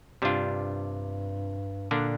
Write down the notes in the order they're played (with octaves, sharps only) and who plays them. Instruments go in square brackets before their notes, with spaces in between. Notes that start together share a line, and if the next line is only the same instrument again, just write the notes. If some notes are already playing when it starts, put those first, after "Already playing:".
[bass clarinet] G2 [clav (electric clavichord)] C3 G3 D4 F4
[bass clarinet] A#2 [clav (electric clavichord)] D3 A#3 D4